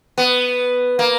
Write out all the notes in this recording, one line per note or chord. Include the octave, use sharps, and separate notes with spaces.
B3
A#3